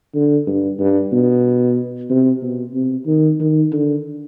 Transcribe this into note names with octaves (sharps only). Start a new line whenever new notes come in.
D3
G2
G2
B2
C3
B2
C3
D#3
D#3
D3